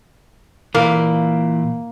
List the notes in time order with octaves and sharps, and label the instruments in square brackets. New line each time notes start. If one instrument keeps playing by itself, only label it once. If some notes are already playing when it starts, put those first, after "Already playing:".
[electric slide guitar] A#2 E3 [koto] A#3